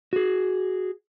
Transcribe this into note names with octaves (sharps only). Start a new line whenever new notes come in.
F#4 G#4